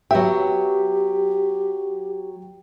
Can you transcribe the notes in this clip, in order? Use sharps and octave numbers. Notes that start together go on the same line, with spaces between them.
F#3 B3 G4 E5 G5